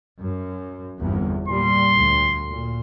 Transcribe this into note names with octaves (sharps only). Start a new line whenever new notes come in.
F#2
G1 E2 C3
A#2 G3 C6
D2
A#2